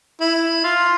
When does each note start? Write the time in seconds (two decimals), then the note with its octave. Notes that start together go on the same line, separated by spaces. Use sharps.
0.21 E4
0.64 F4